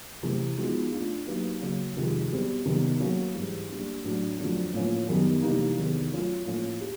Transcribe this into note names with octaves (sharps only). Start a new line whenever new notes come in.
C3 E3 A3
F3 G#3 B3 D#4 F#4
A3 D4 F4
F#3 A#3 D#4 G4 B4
C#3 F#3 A#3
F2 C3 D#3 G#3
B2 G3 C4
C3 D#3 G3 B3
F#3 A#3 C#4
G#2 E3 G3
G3 A#3 D4
A2 F#3 A3 D4 F#4
F2 D3 F#3 A3 D4
A2 F3 A#3 C#4
F#2 D#3 G3 B3
C3 E3 G3 A#3 D#4
E2 C3 D#3
F#3 A3 C#4 F4
A2 F3 A#3 C#4 E4
G4